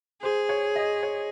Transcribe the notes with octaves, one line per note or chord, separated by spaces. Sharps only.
G#4 C5
C#5
D#5
C#5